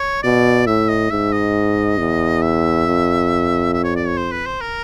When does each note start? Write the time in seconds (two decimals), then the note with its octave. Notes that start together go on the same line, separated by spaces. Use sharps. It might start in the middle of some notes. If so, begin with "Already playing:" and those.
Already playing: C#5
0.23 B2 D5
0.67 A2 E5
0.89 D#5
1.11 G#2 E5
1.32 D#5
1.98 E2
2.42 E5
2.86 F2
3.74 E5
3.84 C#5
3.96 D5
4.07 C#5
4.17 C5
4.32 B4
4.46 C5
4.61 A#4